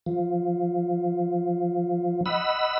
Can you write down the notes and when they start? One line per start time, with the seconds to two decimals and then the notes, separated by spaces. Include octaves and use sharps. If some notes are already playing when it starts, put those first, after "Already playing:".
0.06 F3
2.26 D#5 F#5 B5 E6